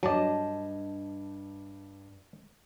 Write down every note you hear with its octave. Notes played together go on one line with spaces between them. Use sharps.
G2 F#3 D5 D#5 A5